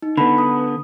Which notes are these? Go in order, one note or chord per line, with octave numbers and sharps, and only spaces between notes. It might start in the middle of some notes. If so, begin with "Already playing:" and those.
D#4
D3 B3 B5
D#6